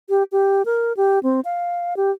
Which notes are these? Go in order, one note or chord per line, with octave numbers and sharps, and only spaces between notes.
G4
G4
A#4
G4
C4
F5
G4